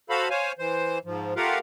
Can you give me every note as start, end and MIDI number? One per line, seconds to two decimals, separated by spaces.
0.10 0.29 66
0.10 0.29 69
0.10 0.29 72
0.10 0.29 77
0.10 0.29 83
0.30 0.52 72
0.30 0.52 73
0.30 0.52 77
0.30 0.52 80
0.59 0.98 52
0.59 0.98 72
1.05 1.34 44
1.05 1.34 53
1.36 1.59 57
1.36 1.59 65
1.36 1.59 67
1.36 1.59 70
1.36 1.59 77
1.36 1.59 78